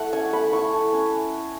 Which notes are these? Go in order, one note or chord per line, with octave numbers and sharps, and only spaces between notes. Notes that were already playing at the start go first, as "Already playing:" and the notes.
Already playing: A3 E4 F#5
C#4 G#5
A3 B5
E4 C#6
A3
C#4